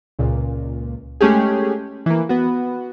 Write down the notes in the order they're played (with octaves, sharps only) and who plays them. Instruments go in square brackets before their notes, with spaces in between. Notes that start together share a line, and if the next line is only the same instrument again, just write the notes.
[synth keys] C#2 A#2
G#3 A3 C#4 G4 G#4
E3 A#3
B3 F#4